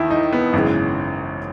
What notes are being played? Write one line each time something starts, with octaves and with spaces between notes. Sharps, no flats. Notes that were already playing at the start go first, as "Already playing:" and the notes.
Already playing: D#2 D#3 E4
D#4
B3
G#1 F#2 C#3 E3